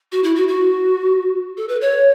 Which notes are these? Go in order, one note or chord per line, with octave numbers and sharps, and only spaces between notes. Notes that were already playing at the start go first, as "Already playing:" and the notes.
F#4
E4
F#4
F#4
A4
B4
C#5